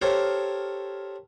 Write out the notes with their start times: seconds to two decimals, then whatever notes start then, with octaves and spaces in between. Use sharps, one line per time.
0.02 G4 A4 A#4 C5 C#5 F5